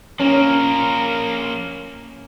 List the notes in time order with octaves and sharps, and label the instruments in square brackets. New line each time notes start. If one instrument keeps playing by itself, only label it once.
[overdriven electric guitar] F3 A#3 [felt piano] C#4 [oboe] A#4